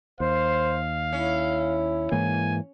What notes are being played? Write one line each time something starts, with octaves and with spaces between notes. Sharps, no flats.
D#2 C5 F5
C#4 E4
G#2 E3 A#3 G#5